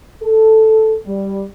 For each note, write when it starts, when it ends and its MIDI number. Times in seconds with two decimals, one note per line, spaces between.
0.22 0.94 69
1.07 1.45 55